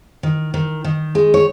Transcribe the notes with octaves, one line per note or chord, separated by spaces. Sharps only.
D#3
D#3
D#3
G#3
C#5